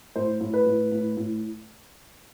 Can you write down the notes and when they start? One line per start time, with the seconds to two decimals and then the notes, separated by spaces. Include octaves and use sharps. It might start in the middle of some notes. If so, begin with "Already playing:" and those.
0.16 A2 C5
0.41 A2
0.54 B4
0.66 A2
0.92 A2
1.17 A2